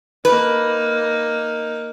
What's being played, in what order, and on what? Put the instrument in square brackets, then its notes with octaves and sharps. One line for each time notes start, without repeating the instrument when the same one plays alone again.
[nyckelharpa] A#3 D#4 [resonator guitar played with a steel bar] B4